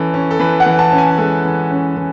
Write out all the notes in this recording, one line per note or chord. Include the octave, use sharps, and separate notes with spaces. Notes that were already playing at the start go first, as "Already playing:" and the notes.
Already playing: E3 C#4 A4
C#4
A4
E3 B4
F#5
E3
A5
C#4
G#5
G#3 A4
E3
C#4
E3